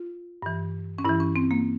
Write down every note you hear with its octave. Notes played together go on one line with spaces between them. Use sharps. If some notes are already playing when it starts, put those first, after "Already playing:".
Already playing: F4
G2 E3
C#4
G2 E3 E4
C#4
C4
A#3